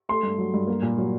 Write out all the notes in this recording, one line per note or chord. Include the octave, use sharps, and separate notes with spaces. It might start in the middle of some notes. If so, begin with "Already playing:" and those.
A3 C6
G2
F#3
G2
A#3
A#2
F#3